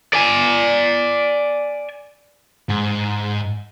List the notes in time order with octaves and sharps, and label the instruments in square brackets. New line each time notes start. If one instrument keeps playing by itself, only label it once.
[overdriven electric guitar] D5 G#5
[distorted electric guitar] G#2